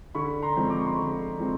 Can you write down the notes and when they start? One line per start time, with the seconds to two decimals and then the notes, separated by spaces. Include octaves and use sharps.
0.15 D3 B5 C#6
0.42 A#5 C6
0.56 F3 G#3 C4
0.70 D6
0.78 C#6
0.87 C6
0.94 D3 B5 C#6
1.39 F3 G#3 C4